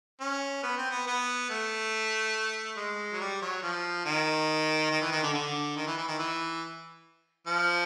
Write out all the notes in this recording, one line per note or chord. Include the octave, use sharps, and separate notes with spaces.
C#4
B3
C4
B3
B3
A3
G#3
F#3
G3
F#3
F3
D#3
D#3
E3
D#3
D3
D3
D#3
E3
E3
D#3
E3
F3